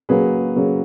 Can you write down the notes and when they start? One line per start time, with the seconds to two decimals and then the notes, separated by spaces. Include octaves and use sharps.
0.09 C#3 F#3 A#3 G#4 B4
0.56 C#3 F#3 A#3